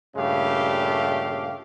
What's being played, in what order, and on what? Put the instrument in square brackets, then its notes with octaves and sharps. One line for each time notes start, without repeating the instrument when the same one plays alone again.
[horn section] G2 A#2 C#3 A3 G4 F5